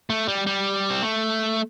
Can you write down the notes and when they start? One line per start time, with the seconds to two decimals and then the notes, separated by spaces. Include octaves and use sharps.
0.10 A3
0.28 G3
0.47 G3
0.90 C4
1.03 A3